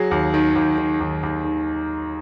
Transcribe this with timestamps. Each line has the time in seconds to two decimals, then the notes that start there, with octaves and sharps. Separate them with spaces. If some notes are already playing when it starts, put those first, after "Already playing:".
Already playing: F#3 G#4
0.11 D#2
0.34 D#3
0.56 D#2
0.78 D#3
1.00 D#2
1.23 D#2
1.44 D#3